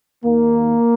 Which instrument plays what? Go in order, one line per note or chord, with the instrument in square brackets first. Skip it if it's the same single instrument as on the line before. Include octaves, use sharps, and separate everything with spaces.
[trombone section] D#2 D#3 A#3